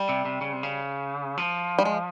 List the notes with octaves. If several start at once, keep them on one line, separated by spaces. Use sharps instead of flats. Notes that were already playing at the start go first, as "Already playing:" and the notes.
Already playing: G3
C3
C3
C#3
C3
C#3
F3
G3
G#3